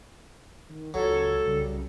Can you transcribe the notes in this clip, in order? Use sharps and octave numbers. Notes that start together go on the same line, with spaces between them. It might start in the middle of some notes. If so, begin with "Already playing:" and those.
D#3
C#2 F#3 A4 G#6
C2 C#3 G3